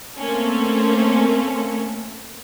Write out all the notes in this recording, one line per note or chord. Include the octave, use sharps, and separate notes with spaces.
A3 A#3 C4 C#4 A4